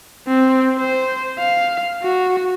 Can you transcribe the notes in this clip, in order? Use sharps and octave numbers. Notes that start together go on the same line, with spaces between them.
C4
C5
F5
F#4